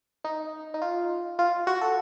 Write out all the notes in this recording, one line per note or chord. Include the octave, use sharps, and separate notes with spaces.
D#4
D#4
F4
F4
F#4
A4